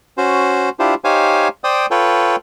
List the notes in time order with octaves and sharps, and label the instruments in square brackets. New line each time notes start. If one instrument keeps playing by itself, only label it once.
[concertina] C#4 F#4 C5
D4 E4 F4 G4 C5
D#4 G4 C5 C#5 F5 G#5
C5 D5 G5 D#6
F4 A4 B4 C#5 G5